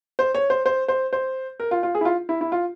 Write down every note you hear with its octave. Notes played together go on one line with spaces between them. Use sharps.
C5
C#5
C5
C5
C5
C5
A#4
F4
F4
G#4
E4
F4
E4
E4
F4